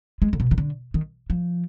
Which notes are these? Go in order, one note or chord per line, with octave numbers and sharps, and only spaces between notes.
G#3
D3
B2
D#3
D3
D#3
F3